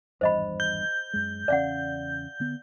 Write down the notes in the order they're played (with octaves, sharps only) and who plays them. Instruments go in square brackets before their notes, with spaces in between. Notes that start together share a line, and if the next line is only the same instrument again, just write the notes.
[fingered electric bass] G#1 E2 G2 [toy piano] C5 D#5 B5
[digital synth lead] G6
[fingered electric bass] F#2 G#3
[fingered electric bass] E2 C#3 C#4 [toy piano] D5 F5 F#5
[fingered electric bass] D3 B3